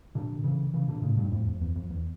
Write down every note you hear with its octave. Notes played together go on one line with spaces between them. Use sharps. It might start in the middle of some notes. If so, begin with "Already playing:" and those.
A#2 D3
C#3 E3
C#3 E3
A#2 D3
A2 C#3
G2 A#2
F2 A2
F2
E2
F2
E2